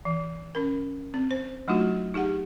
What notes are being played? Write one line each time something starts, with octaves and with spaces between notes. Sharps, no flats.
E3
C#4 A#4
C4
C5
F#3 A3 D4 D#4 F4 F#4
D#4 G4 G#4 F#5